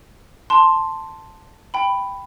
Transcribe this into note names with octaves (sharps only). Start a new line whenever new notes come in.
A5 C6
G5 B5